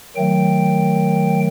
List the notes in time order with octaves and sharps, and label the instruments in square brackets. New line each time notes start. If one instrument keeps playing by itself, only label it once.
[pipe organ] D#3 F#3 A3 G5